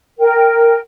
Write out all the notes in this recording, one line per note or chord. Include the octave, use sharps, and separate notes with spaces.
A#4 G5